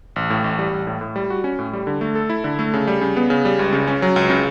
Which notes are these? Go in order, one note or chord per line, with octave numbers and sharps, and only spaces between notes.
A1
A2
A1
G3
A1
A2
A2
G3
F#4
C#4
A2
G3
D3
A3
A4
E4
D3
A3
C#3
G3
C#3
B3
C#3
G3
C#2
C#3
C#4
F#3
C#2
C#3